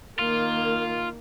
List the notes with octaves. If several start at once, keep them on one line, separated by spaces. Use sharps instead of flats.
D#3 A#3 F4